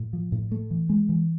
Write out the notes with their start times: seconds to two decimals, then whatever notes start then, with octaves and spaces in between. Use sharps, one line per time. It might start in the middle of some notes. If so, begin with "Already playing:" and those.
Already playing: A2
0.13 F3
0.32 A2
0.52 A3
0.71 E3
0.89 G#3
1.09 E3